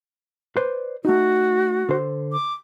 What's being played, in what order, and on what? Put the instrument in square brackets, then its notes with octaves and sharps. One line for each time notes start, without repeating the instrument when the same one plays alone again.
[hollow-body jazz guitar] B4 C5 D5
[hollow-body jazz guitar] A3 D#4 [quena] F#4
[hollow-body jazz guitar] D3 C5
[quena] D6